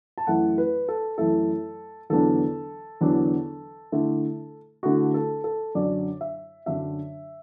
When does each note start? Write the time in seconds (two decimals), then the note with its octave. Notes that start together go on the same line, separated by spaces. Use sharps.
0.18 A5
0.27 F#2 E3 A3 E4 F#5
0.58 B4
0.89 A4
1.18 F#2 E3 A3 E4 A4
2.10 E2 D3 F#3 B3 D4 A4
3.01 E2 D3 F#3 B3 D4
3.92 D3 A3 E4
4.83 D3 A3 E4 F#4
5.14 A4
5.44 A4
5.75 F#2 D3 F#3 D4 D5
6.21 E5
6.66 F#2 D3 F#3 D4 E5